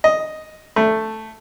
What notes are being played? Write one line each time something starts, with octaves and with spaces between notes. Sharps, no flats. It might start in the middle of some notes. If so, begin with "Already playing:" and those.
D#5
A3